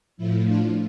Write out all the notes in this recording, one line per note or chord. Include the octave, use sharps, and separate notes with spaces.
A2 F3 E4
D4 F4